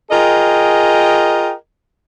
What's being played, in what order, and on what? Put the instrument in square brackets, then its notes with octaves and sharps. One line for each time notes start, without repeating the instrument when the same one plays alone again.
[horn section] F4 G#4 A#4 D#5 G5